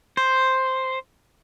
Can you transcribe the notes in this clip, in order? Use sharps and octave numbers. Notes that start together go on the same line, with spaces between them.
C5